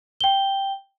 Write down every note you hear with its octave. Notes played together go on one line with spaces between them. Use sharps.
G5 G7